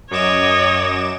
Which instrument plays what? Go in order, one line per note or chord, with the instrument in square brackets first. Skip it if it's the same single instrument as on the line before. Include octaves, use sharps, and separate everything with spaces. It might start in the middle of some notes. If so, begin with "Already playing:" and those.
[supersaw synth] F#2 D6 E7 [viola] C#5 D#5